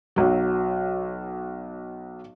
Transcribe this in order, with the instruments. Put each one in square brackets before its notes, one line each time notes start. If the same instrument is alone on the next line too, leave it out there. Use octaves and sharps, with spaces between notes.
[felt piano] B1 F#3